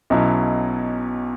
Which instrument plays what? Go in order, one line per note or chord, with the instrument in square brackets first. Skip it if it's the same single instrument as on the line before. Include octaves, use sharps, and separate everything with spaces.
[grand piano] B1 B2 F#3 C#4 E4